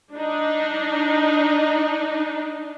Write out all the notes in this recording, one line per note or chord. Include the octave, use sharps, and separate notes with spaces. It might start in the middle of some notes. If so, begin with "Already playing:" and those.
D4 D#4